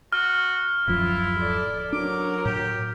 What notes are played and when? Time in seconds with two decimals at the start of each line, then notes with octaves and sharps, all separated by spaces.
0.13 F#4 F6
0.88 D1 F#2 F3 E4 F4
1.39 A4 D5
1.93 F#3 D4 A#4 D6
2.45 A2 G4